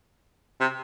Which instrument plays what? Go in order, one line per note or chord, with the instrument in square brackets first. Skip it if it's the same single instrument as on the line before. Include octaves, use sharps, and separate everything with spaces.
[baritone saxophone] C3